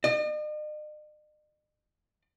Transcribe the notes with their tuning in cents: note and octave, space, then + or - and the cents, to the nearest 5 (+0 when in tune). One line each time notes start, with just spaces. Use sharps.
D#5 -45